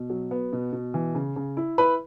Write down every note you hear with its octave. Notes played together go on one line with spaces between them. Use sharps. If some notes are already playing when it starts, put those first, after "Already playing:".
Already playing: B2
F#3
B3
B2
B2
E3
C#3
C#3
E4
E4 B4 B5